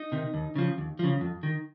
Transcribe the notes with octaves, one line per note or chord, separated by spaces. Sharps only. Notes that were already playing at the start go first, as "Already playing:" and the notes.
Already playing: D#4
C3 D#3
D#2
C#3 F3
D#2
C#3 F3
F2
D#3